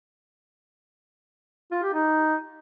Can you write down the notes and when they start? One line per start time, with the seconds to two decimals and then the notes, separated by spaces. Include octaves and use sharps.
1.71 F4
1.83 G4
1.94 D#4